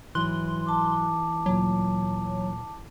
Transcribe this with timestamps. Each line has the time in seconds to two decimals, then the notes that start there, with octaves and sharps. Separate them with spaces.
0.15 G#2 E3 F#3 C6 F#6
0.67 A5 D6
1.46 D2 A#2 F#3